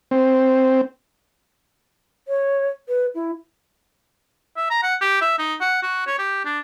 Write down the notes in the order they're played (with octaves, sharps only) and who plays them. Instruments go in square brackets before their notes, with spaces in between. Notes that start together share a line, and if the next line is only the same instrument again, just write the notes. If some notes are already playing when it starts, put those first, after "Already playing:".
[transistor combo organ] C4
[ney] C#5
B4
E4
[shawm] E5
A#5
F#5
G4
E5
D#4
F#5
F#4
C#5
G4
D4